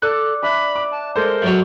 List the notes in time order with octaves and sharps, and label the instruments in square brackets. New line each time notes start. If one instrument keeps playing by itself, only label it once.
[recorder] A4 [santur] D5 [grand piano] F#6
[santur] D4 E5 [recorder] B5
[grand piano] D6
[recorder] A5
[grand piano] G#3 A4 C5 [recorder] A#4
[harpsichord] F#2 F#3